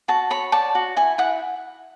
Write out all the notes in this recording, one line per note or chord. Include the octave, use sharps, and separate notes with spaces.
F#4 A5
C#5 B5
D5 A5
F#4
E4 G#5
E4 F#5